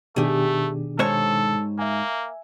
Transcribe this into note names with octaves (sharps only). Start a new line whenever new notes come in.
B2 D#3 A3 D4 G4 G#4
G#2 A4 C5 C#5
A#3 E5 G#5